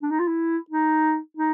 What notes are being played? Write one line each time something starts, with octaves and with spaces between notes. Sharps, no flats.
D4
D#4
F4
E4
D#4
D#4